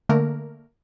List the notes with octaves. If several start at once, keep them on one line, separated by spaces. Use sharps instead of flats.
D3 A3 A#3 A#4